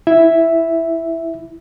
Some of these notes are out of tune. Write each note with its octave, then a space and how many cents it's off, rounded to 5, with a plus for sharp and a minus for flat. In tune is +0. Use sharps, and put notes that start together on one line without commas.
E4 +5 E5 +0